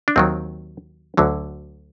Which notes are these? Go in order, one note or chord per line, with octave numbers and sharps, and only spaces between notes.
D4
D#2 D#3 F#3 C4
D2 D3 F#3